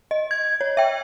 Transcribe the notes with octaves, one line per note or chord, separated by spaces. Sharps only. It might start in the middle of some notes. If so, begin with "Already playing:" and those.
D#5
G#6
C#5
E5 G5